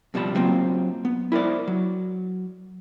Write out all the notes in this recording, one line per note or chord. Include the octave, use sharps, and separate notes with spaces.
F2 B2 F3 G3 A5 B5
F#3 A#3 C4 F4
B3
E4 A#4 C5 D5
F#3